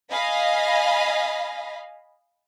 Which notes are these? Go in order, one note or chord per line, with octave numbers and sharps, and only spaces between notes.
D#5 F5 G#5 B5